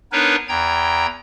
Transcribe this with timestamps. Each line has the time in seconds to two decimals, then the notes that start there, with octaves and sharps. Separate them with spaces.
0.12 B3 D4 D#4 A#4 B4 C#5
0.49 E2 G5 A#5 G#6